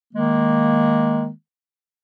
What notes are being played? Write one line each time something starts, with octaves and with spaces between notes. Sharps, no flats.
D#3 G#3 A#3